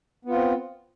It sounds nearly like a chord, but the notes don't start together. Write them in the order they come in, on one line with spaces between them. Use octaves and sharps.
B3 F4 C4